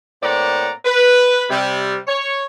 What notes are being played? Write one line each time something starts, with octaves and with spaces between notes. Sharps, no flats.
A2 A#3 C4 D5 F#5 A#5
B4
C3 G3
C#5